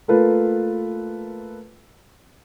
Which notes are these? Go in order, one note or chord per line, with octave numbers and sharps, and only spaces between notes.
A3 A#3 F4 A4 B4